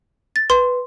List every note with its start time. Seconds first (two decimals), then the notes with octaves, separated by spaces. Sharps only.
0.36 A6
0.50 B4 C6